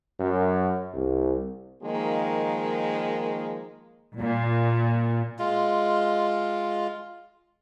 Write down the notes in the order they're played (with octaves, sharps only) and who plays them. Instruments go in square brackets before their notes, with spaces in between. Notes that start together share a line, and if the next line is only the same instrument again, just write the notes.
[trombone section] F#2
C2
[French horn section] D#3 F3 G#3 A#3
[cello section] A#2
[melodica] G#3 F4